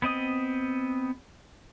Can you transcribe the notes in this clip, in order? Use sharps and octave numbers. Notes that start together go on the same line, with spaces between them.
B3 C4 D#5 D#6